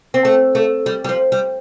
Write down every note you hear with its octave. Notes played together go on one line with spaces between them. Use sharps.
C4
A3
A3
G3
G3
F3
G3